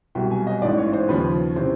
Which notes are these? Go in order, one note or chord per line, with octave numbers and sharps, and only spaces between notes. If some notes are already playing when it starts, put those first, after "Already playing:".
C2 B2 F#3 G5
G#5
D#5
A1 G#2 E3 D5
C#5
C5
D#2 C#3 F3 B4
C3 E3 C5